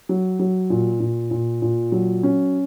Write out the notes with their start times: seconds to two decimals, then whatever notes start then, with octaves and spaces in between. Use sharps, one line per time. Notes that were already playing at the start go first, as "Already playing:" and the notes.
0.09 F#3
0.39 F#3
0.70 A#2
1.00 A#2
1.31 A#2
1.62 A#2
1.92 F#3
2.23 C#4